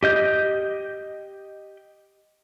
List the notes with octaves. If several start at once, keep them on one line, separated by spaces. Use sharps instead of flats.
G4 D#5 G6